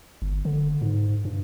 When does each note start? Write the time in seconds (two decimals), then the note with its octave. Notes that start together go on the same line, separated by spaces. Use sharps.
0.22 G1
0.45 D3
0.82 G#2
1.25 G2